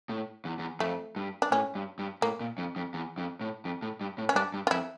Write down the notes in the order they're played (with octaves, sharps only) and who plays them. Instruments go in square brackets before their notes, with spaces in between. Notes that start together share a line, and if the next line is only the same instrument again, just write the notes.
[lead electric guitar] A2
E2
E2
[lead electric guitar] F2 [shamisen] A3
[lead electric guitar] G2
[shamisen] D4
[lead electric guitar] A2 [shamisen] C#4
[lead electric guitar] G2
G2
[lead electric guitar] A2 [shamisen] A#3
[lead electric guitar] A#2
F2
F2
E2
F2
A2
F2
A2
G2
A2
[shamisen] C#4
[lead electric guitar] G2 [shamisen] D4
[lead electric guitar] G2
[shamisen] F4
[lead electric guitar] F2 [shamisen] E4